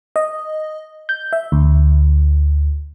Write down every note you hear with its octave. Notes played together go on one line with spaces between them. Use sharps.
D#5
G6
E5
D2